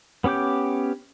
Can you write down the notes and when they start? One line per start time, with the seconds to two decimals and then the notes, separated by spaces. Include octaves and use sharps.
0.24 B3 C#4 G4 D6 G6